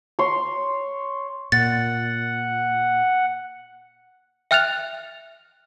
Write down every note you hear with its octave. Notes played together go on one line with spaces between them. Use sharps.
C#5 C6
A#2 F#5 A6
E5 G5 F6 F#6 A6 F7